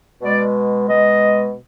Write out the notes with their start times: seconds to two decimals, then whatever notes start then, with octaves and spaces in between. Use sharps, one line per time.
0.22 B2 G#3 D5
0.89 B2 G#3 D#5